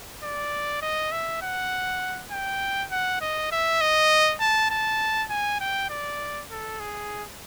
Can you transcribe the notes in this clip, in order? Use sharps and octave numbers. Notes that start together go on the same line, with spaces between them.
D5
D#5
E5
F#5
G5
F#5
D#5
E5
D#5
A5
A5
G#5
G5
D5
A4
G#4